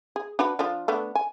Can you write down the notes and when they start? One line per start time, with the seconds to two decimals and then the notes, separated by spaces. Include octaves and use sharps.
0.16 G#4
0.39 D4 F#4 B4
0.59 F3 D4 F4
0.88 A3 B3 D4
1.15 G#5